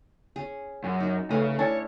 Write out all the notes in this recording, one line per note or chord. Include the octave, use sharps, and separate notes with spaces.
C#4 G#4
F#2
D#4 F#4
C#3 A3 C#4 G#5 A#5
C#4 D4 E4 C#5 G#5 A5